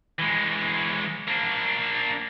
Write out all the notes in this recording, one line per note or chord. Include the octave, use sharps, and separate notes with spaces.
E3 G#3
A#3 D4